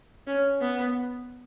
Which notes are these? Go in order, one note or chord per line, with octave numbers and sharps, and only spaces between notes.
C#4
B3